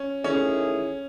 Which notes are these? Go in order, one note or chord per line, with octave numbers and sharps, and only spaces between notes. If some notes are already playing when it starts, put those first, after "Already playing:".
Already playing: C#4
D#3 A3 C#4 E4 G#4